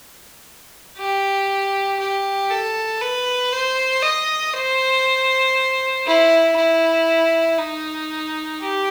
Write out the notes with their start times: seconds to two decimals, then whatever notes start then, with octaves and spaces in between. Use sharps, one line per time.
0.97 G4
2.00 G4
2.50 A4
3.01 B4
3.52 C5
4.03 D#5
4.54 C5
6.07 E4
6.57 E4
7.59 D#4
8.60 G4